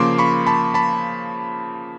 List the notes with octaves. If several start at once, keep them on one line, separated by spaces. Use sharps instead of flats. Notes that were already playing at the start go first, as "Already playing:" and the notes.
Already playing: C#3 F3 A#3 C6 D6
B5 C#6
A5 B5
A5 B5